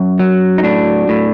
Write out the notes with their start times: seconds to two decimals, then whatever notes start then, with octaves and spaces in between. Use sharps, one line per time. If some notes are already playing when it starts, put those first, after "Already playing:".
Already playing: F#2
0.20 F#3
0.58 D#4
0.63 A2 D4
1.09 A2